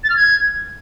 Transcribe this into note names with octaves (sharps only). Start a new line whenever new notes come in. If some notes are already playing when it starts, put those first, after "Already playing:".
A6
F6
G#6